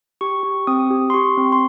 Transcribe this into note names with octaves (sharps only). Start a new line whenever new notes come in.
G4 C#6
G4
C4 D#6
G4
C6
G4 C#6
C4
C6